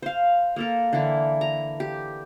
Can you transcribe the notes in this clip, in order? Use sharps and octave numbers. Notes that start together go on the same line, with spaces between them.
C5 F5
A#3 A4 A#4
D3 E3 A#3 E4
A#5
G4